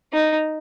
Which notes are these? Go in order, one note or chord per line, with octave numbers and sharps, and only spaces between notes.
D#4